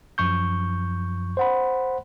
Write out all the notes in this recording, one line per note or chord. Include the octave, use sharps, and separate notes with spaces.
F#2 F3 C#6 G6
C5 F#5 B5